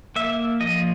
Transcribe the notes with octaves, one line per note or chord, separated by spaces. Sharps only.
A#3 E5
F3 D#5